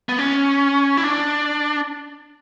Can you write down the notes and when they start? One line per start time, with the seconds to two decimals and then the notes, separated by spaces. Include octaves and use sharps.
0.09 B3
0.19 C#4
0.97 E4
1.04 D4